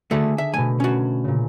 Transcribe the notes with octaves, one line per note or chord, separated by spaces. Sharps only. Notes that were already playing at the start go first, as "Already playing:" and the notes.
D3 A3 F#4 G#4 A4
E5
B2 A3 G#5
C#4 F#4
A#2 C#3